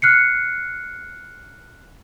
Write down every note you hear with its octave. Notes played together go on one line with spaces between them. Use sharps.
F6 F#6 C7 C#7